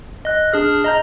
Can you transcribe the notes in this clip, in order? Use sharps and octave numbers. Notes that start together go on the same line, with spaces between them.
D#5 F#6
D4 G#4 F6
D#5 A#5 G6